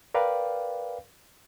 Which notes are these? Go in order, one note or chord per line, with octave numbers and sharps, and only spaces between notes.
A#4 B4 D5 F5 G5